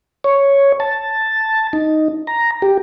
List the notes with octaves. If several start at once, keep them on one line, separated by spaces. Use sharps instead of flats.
C#5
A5
D#4
A#5
G4